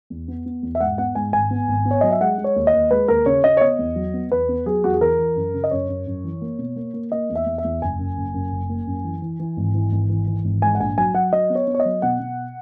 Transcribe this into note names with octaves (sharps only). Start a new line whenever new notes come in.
E2
B3
B3
E2
E5
G#2 F#5
B3 F#5
G#2 G#5
G#1 G#5
B3
G#1
B3
C#5
F#3 D#5
E5
G#3 F#5
G#3
C#5
D#2
D#5
D#2
G#3 B4
D#2 A#4
C#3 C#5
C#3 D#5
C#5
B3 D#5
E2
F#3
B3
E2 B4
B3
F#3 G#4
E2 F#4
G#4
E3 A#4
E3
F#2
C#3
D#5
F#2 C#5
F#2
F#2
E3
A#3
B2
A#3
A#3
A#3 D#5
E2
E5
E2
E5
E2
F#1 G#5
F#2
F#1
F#2
F#1
A#3
F#2
E3
E3
E3
G#1
E3
G#1
E3
E3
G#1
G#2 G#5
F#5
A#1 G#5
F#3 G#5
F#3 F#5
F#3 D#5
B3
C#5
B3
C#5
D#5
F#3
B2 F#5
B2